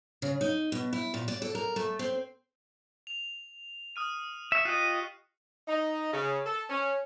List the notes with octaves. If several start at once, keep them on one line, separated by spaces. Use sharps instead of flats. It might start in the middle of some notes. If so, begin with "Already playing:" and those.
C#3
D#4
B2
E4
A#2
D5
A4
A#4
A3
C4
F7
D#6 F6 D#7
E5 C#6 B6 C#7
F4 G4 D#5 F#6 C7 D#7
D#4
C#3
A4
C#4